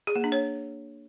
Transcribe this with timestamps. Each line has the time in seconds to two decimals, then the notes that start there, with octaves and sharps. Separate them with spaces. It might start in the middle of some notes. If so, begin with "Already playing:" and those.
0.07 G#4
0.16 A#3
0.24 D4
0.32 C#5